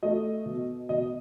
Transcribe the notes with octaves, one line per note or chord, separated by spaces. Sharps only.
A3 D#5
B2
B2 D#5